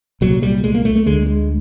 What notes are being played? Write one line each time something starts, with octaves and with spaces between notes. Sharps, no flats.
C2 A#2 F#3
G3
G#3
A#3
A3
A3
D2 D3 G#3
G#3